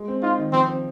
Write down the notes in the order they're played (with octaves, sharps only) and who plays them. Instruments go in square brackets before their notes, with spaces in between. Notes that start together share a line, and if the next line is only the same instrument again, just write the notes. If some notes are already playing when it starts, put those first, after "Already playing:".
Already playing: [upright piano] G#3
C4
[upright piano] D#4 [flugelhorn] F4
[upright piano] D#3
[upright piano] F3 [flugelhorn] C4
[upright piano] C4